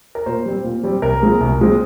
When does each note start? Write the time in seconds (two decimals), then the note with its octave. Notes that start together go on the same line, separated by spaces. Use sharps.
0.15 A#4
0.26 A#2 C5
0.46 G3 C4
0.64 A#2
0.83 G3 C4
1.02 C2 A#4
1.21 A#2 G#3 C4
1.41 C2
1.59 A#2 G#3 C4